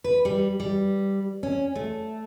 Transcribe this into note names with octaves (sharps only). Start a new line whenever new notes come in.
B4
G3
G3
C#4
A3